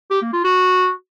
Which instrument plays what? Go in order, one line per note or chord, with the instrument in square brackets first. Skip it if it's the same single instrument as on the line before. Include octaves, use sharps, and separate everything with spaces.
[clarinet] G4
A#3
F4
F#4